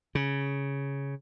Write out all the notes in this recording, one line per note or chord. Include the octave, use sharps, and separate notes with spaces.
C#3